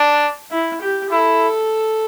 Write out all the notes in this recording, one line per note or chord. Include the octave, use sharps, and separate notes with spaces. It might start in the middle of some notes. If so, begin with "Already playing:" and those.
Already playing: D4
E4
G4
E4 A4